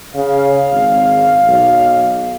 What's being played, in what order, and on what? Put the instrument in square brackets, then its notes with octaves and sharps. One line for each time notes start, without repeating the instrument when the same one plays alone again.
[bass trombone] C#3 [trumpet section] F5
[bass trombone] G#1
B1